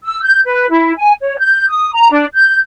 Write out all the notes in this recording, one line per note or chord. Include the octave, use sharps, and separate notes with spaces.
E6
G6
B4
E4
G#5
C#5
G6
D#6
A#5
D4
G6